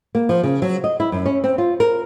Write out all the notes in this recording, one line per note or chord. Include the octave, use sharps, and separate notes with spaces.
A#3
F3
C#3
F#3
D#5
E4
F#2
C#4
C4
F4
A#4